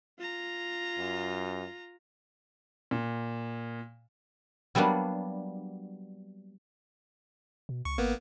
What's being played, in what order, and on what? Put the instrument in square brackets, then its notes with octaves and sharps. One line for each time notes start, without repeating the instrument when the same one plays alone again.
[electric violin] F4 A#5
[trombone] F#2
[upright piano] A#2
[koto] F#3 G3 A#3 B3 D4
[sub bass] B2
[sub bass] C#2 [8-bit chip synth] C#6
[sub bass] G#1 [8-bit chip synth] A#3 B3